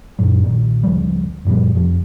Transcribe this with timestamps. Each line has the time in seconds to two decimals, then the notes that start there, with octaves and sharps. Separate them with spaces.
0.19 F#2 A#2 F#3
0.43 B1 A#2 D#3
0.83 D2 C#3 F3 G3
1.45 F#2 A#2 F3 G3
1.74 F2 C3 F3